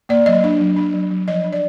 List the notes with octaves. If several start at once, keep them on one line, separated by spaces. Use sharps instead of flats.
A#3 D5
F#3 D#5
D4
F#3
D4
F#3
F#3
F3 D#5
D4
D5